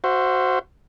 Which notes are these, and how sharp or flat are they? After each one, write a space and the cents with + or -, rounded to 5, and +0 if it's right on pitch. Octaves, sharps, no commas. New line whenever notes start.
F#4 +0 C5 +0 E5 +40